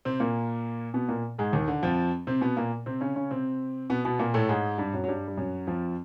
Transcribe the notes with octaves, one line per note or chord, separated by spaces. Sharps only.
C3 C4
A#2 A#3
B2 B3
A#2 A#3
G#2 G#3
D#2 D#3
D3
F2 F3
C3 C4
B2 B3
A#2 A#3
C3 C4
C#3 C#4
C#3 C#4
C3 C4
B2 B3
B2 B3
A#2 A#3
A2 A3
G#2 G#3
G2 G3
F#2 F#3
F#3
G2 G3
G3
F#2 F#3
F2 F3